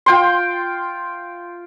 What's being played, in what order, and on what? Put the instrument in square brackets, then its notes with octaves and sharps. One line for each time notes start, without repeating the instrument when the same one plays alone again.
[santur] F4 G5 C6